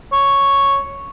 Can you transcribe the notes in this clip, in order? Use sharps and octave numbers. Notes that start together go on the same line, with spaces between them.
C#5